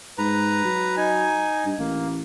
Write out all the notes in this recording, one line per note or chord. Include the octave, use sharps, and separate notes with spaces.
G#2 B4 A#5
F#3
D#4 G#5
G2
A1 A#3